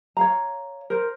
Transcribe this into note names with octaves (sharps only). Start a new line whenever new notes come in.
C#5 F5 A#5
A#4 C5